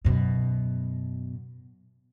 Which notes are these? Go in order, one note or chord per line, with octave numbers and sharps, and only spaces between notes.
F#2 B2